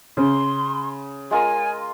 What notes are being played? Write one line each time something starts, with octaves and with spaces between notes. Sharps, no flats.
C#3 C6
G#3 F4 A#4 G#5